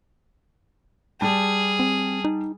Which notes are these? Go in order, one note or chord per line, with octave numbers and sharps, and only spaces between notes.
G3 G#4 A5
C4
D#4